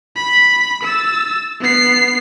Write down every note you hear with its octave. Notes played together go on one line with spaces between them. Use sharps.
B5
E6 A6
B3 C7